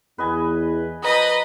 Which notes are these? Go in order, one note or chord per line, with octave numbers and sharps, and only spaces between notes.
E2 B4 D#5 G#5
F3 B4 D#5 A#5 D#6